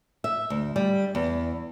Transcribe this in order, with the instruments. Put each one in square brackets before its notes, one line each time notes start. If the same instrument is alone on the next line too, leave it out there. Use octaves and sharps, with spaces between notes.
[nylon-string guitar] E5
D2
G3
E2